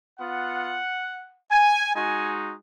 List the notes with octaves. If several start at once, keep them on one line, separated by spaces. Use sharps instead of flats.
B3 F4 F#5
G#5
G#3 D#4 F#4 G#5